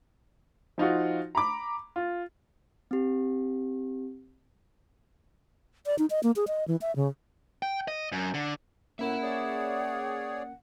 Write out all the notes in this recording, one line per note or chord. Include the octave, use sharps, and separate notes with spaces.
F3 D#4 F4 F#4
A#5 B5 D6
F4
C4 G4
D5
D#4
D#5
A#3
G#4
D#5
E3
E5
C#3
G5
D#5
F#2
D3
A2 A#3 C#4 A#4 E5 F#5 B5
G#4 C#5 D5